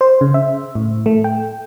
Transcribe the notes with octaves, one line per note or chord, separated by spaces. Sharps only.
C5
C#3
E5
A2
A3
G5